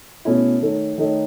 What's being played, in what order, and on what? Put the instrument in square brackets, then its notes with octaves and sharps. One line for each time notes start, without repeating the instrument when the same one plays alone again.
[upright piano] B2 A3 C#4 E4
D#3 A3 D#4 A4 C#5
D#3 A3 D#4 A4 C#5